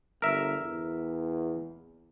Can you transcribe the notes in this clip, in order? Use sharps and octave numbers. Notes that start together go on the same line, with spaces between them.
G1 A#4 E5
E2